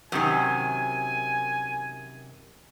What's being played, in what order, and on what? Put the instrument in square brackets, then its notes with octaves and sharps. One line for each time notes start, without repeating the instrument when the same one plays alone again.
[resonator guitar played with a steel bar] F#2 C3 D#3 [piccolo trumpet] G#5